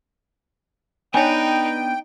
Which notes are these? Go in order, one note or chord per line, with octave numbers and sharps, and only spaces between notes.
B3 D4 D#4 B4 C#5 G5 G#5